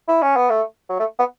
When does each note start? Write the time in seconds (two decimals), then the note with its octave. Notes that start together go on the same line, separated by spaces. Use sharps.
0.08 E4
0.22 C#4
0.36 B3
0.50 A3
0.90 F#3
0.99 A3
1.19 B3